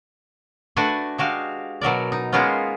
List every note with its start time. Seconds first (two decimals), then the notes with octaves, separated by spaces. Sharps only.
0.77 A3 D4 F#4 B4 F#5 G#5
1.18 G#3 F#4 G4 F5
1.81 B2 F#3 A#4 D5
2.12 D#4
2.32 G#3 A#3 B3 C#4 F4